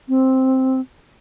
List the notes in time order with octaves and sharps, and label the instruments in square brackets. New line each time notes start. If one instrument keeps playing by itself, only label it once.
[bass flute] C4